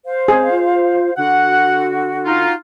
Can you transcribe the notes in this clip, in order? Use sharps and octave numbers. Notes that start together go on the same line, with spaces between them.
C5 F5
C4 G#4
F4
D3 F#4 F#5
D#4 F4